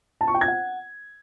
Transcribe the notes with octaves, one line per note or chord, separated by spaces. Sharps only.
A5
C#6
G5
G#6
F#5